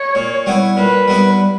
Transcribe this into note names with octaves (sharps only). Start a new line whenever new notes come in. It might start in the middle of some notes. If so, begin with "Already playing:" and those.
Already playing: C#5
A#2
G3 B3 E4
A#2 B4
G3 B3 E4